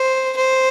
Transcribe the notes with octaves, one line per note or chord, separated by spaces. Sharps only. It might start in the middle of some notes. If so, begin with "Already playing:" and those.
Already playing: C5
C5